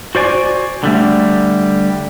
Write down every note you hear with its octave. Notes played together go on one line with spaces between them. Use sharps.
F#4 C5 D5 G#5
D3 G3 A3